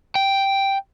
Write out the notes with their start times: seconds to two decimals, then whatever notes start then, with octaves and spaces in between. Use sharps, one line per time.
0.15 G5